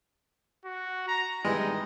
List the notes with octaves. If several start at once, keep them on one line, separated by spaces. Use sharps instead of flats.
F#4
A#5
E3 G3 G#3 D#4